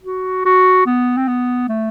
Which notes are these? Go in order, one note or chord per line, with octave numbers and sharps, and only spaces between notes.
F#4
F#4
B3
C4
B3
A3